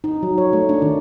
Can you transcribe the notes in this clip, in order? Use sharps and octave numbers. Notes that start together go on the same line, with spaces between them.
D#4
F#3
C#5
A3
D4
D#3